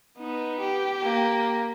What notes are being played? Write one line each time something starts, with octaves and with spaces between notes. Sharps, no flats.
B3 D#4
G4
A#3